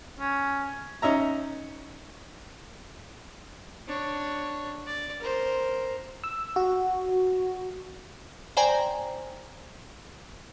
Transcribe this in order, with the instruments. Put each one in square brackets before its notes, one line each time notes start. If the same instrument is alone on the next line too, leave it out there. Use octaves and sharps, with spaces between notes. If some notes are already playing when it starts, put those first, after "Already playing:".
[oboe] C#4
[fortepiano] C#4 D#4 E5 A#5
[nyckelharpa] D4 C#5
D5
A#4 C5
[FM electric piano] E6
F#4
[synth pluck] C5 D5 G5 G#5 A#5